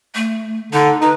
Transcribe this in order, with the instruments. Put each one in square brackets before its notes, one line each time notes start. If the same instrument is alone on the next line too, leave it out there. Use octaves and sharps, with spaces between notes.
[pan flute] A3
[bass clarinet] D3 [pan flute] D#4
[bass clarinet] D#4 [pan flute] B4